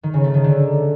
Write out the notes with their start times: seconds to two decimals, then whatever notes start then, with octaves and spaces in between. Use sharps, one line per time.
0.03 D#3
0.14 C#3
0.24 A3
0.34 D#3
0.44 D3